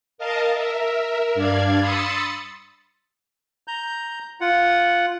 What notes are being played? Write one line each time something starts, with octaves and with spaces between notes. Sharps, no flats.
A#4 D#5 F5 A5
A#4 E5
G2 D4 D5 F5 G#6
B5 C6 D#6 E6 A6 C#7
A#5 G6
F4 F#5